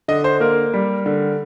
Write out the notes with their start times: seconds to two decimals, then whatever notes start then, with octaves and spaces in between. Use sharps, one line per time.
0.08 D3 D#5
0.24 C5
0.40 A#3 A#4
0.74 G3
1.06 D3